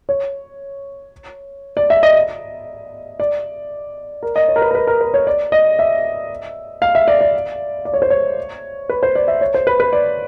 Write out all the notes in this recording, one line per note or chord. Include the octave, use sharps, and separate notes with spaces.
C#5
D5
E5
D#5
D5
A#4
D#5
C#5
A#4
B4
A#4
B4
A#4
B4
C#5
D5
D#5
E5
F5
E5
D5
D5
D5
C#5
C5
C#5
B4
C5
D5
E5
C#5
C5
B4
B4
D5